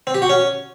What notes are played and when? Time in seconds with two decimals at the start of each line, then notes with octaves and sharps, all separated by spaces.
0.07 C4
0.15 G4
0.22 F#4
0.29 C#4